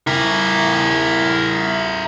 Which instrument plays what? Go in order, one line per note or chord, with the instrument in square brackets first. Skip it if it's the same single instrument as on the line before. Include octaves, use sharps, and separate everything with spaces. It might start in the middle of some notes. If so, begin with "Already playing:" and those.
[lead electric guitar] E4 A#4